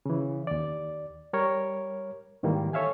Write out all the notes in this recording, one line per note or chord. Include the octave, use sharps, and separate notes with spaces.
C#3 E3
D#2 D5
G3 A#4 C#5
G#2 D#3 E3 G3 A#3
A4 C#5 E5 F5 G#5